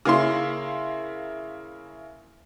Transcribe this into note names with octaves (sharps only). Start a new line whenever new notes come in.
C#3 A#3 E4 C6